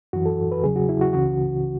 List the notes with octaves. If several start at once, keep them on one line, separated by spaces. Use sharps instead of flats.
F#2 E3 F#4
A4
B4
E2 C#3 F#3 G#4
F#4
E4
F#4
C#2 C#3 E3 F#4